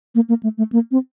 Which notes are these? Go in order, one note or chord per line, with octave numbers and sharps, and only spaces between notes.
A#3
A#3
A3
A3
A#3
C4